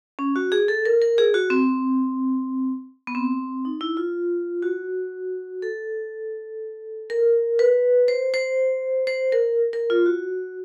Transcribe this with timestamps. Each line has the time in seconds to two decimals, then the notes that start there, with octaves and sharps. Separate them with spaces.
0.19 C#4
0.36 F#4
0.52 G#4
0.68 A4
0.85 A#4
1.02 A#4
1.18 G#4
1.34 F#4
1.50 C4
3.07 B3
3.15 C4
3.65 D#4
3.81 E4
3.97 F4
4.63 F#4
5.62 A4
7.10 A#4
7.59 B4
8.08 C5
8.34 C5
9.07 C5
9.32 A#4
9.73 A#4
9.90 F4
10.06 F#4